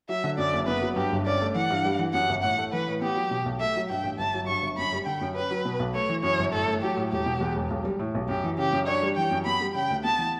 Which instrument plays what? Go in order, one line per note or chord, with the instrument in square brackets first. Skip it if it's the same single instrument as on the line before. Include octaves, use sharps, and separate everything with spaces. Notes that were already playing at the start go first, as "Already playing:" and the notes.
[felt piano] F#3 [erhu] E5
[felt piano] D3
[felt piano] F#2 [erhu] D5
[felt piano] F#1
[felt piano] B3 [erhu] B4
[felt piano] F#3
[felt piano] G2 [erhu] G4
[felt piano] G1
[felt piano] C#4 [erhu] D5
[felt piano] A3
[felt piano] E3 [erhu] F#5
[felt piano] G2
G3
E3
[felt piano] F#2 [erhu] F#5
[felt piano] G1
[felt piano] A2 [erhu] F#5
[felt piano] A3
[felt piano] E3 [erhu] B4
[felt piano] A2
[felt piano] B3 [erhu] G4
[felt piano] F#3
B2
B1
[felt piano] A3 [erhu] E5
[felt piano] F#3
[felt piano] G2 [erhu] G5
[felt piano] A1
[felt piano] G1 [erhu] A5
[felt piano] F#3
[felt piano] G2 [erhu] C#6
[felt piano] G1
[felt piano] F#2 [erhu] B5
[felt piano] G3
[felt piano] D3 [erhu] G5
[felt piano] F#2
[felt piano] C#4 [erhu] B4
[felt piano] F#3
B2
B1
[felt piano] A3 [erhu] C#5
[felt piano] E3
[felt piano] F#2 [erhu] C#5
[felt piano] G1
[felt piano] A2 [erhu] A4
[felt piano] A3
[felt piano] F#3 [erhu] G4
[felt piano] A2
[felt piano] E1 [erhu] G4
[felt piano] B2
E2
E1
B1
G3
A2
B1
[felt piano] F#2 [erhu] G4
[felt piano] E3
[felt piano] C#3 [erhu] G4
[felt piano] F#2
[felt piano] D4 [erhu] C#5
[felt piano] G3
[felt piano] E3 [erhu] G5
[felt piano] F#2
[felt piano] B3 [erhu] B5
[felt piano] G3
[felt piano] C#3 [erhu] G5
[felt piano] D2
[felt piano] B3 [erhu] A5
[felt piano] E3